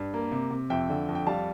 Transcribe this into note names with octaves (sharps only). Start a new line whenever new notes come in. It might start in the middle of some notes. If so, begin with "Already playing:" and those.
Already playing: G2
A#3
C3
C3
F2 E5 G5
D3
F2
G5
G3 F5 A5